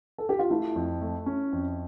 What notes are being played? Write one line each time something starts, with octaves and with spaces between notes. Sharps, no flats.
A4
G4
F4
A3 E4
F2
A3
C#4
F2